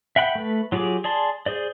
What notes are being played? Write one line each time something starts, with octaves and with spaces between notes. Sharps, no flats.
E5 F#5 G5 B5 F#6
A3 B4
F#3 F4 G4 G#4 D6
G#4 D5 A5 C6
G#4 C5 D5